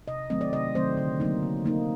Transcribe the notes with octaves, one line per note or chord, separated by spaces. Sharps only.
C3 D#5
D#3 F#3 A3 C4 D#5
D5
C3 D#5
D#3 F#3 A3 C4 C5
D3
F#3 A#3 D#4
D3
F#3 A#3 D#4